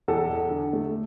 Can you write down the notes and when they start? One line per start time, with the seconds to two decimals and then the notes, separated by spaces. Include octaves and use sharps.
0.08 E2 A4
0.29 E2
0.50 D3
0.73 A3